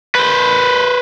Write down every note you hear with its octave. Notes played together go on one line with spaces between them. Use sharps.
B4 C5